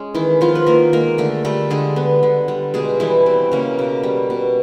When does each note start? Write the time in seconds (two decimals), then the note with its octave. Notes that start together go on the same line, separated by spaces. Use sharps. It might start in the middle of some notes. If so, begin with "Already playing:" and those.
Already playing: G#3 C#4
0.14 D#3 E3 E4
0.41 F3 B3 F4
0.55 B4
0.66 D#3 A#3 A#4
0.93 G#3 A#3 A#4
1.18 D3 A3 A4
1.45 G3 A3 A4
1.70 D3 G#3 G#4
1.96 B3
2.23 D3
2.48 G3
2.74 B2 G#3 G#4
3.00 E3 G3 E4
3.26 B2 C4
3.52 C#3 A#3 C#4
3.79 B2
4.03 G3
4.30 B2